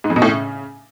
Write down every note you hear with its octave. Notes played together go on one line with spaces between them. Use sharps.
G#2
F2
B2
A2
C#3